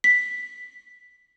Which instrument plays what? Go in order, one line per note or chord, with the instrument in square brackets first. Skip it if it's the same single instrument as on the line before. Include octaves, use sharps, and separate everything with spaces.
[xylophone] B6